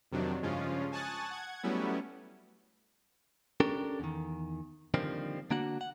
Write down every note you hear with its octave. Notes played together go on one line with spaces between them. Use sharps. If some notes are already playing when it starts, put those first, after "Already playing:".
F2 C3 D#3 F#3 D4
G2 C#3 F3 G#3 C#4 F4
G#5 A5 C#6 D#6 F#6 A6
F#5 G#6
F#3 G3 A3 B3 C#4 E4
C#4 D4 G4 A4 A#4
E2 D#3
D3 D#3 F3 G3 A#3 C4
D3 A#3 D4 F#4 F#5
F#5